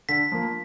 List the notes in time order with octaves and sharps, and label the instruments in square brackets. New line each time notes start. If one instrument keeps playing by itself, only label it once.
[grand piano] D3 [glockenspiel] B6
[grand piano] F3 A#3